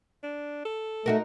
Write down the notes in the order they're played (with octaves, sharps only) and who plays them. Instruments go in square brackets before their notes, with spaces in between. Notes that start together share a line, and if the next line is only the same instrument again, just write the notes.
[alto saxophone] D4
A4
[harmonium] A3 [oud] D#4 F#4 A#4